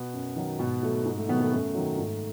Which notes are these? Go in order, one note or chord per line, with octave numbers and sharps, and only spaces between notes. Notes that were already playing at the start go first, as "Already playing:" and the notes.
Already playing: B2 B3
F#2
D#3 F#3
G#2 B2 B3
F#3 A3
G#2
A3
B2 D#3 F#3 B3
A3
F#2 A3
D#3 F#3
G#2